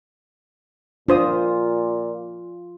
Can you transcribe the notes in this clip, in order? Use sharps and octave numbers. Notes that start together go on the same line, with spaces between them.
A#2 D4 F4 C5 D#6